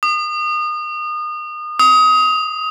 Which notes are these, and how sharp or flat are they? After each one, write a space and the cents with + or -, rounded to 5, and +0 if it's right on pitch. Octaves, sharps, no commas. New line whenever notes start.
D#6 -30
D#6 +25